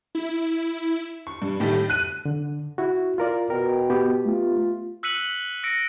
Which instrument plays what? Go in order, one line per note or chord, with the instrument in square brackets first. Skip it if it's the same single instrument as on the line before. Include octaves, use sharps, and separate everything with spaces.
[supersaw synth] E4
[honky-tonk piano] C#6
G2
A2 D#3 G3 A3
F#6 D#7
[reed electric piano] D3
E4 F#4
F4 A#4 D5
[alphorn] B2 [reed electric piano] A#4 [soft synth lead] G5
[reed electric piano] B3 G4
[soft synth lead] A3 [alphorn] F4
[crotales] E6 F#6 B6 C#7 D#7 F#7
E6 A#6 C#7 D7